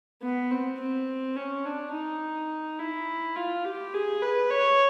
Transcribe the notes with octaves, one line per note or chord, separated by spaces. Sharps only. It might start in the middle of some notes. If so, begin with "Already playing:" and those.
B3
C4
C4
C#4
D4
D#4
E4
F4
G4
G#4
B4
C#5